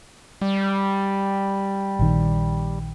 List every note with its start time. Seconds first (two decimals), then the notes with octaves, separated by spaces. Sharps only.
0.42 G3
1.99 A#1 D#3